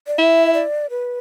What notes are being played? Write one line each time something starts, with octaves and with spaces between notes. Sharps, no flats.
D5
E4 E5
D5
B4